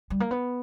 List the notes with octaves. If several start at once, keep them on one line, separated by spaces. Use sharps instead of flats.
G3
A#3
B3